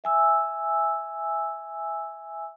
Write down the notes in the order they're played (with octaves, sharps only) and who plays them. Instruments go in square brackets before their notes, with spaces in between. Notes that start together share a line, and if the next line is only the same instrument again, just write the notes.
[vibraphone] E5 G#5 E6